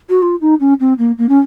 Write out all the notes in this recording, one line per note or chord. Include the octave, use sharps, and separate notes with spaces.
F#4
F4
D#4
C#4
C4
A#3
A#3
C#4